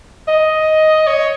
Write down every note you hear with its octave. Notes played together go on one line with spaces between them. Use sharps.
D#5
C#5